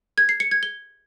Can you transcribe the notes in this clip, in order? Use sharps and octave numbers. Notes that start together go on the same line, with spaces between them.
G#6
C7
C#7
G#6
G7